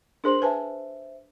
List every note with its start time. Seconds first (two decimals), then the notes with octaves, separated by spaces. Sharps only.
0.24 D4 G#4 A#4 C5 C6 F#7
0.42 B4 C5 E5 G#5 A5